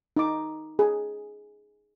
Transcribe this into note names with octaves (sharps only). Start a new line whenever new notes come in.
D#4 D6
G#4